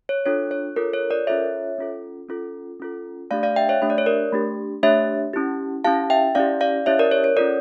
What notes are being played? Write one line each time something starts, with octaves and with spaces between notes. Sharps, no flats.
C#5
D4 F4 A4 C#5
C#5
D4 F4 A4 A#4
C#5
A#4 D5
C#4 F4 A4 C#5 E5
C#4 F4 A4
C#4 F4 A4
C#4 F4 A4
A3 D4 G4 D5 F5
D5 F5
E5 G5
C#5 E5
A3 D4 G4 E5
D5
C#5
A#4 D5
A3 D4 G4
A3 D4 G4 C#5 E5
C#4 E4 G4
C#4 E4 G4 F5 A5
E5 G5
C#4 E4 G4 D5 F5
D5 F5
C#4 E4 G4 C#5 E5
A#4 D5
C#5
C#5
C#4 F4 A4 A#4 D5